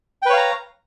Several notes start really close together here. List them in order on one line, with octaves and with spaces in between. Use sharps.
G5 B4 C#5 F5 A#5